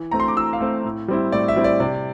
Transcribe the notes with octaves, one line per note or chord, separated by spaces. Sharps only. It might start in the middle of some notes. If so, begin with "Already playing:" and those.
Already playing: E3
A3 C4 A#5
C6
D6
E3 E6
F5
A3 C4
A2
G3 C4 E4
A2 D5
E5
G3 C4 E4
D5
C3 D5